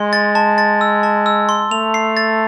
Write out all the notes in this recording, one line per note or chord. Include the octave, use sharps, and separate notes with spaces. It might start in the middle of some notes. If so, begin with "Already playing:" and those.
Already playing: G#3 C6
A6
A5
A6
E6
A5
E6
C6
A3 F7
C7
A6